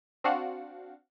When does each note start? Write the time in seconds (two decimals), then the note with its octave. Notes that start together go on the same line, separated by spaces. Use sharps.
0.24 C4 D4 F#4 F5 F#5